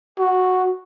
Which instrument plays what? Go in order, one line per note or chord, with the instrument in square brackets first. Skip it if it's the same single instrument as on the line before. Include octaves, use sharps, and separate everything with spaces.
[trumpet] F#4